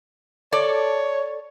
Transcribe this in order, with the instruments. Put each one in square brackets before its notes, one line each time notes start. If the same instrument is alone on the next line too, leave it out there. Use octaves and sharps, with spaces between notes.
[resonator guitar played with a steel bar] A4 D5 [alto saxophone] C#5